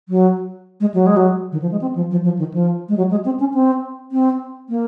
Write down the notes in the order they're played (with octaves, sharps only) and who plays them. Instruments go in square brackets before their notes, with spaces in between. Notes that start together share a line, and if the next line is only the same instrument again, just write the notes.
[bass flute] F#3
G#3
F#3
G#3
F#3
D#3
F3
G#3
C4
F3
F3
F3
D#3
F3
G#3
F#3
G#3
C4
C#4
C4
C4
A#3